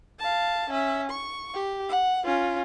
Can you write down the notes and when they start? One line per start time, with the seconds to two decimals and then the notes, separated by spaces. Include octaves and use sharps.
0.20 F5 A5
0.70 C#4 E5
1.10 C#6
1.54 G4
1.89 F#5
2.25 C#4 F4